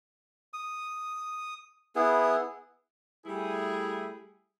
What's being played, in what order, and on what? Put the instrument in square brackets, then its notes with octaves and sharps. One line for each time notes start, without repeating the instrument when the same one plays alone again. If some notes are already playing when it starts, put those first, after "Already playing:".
[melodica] D#6
B3 E4 G#4
[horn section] G3 A3 E4 G#4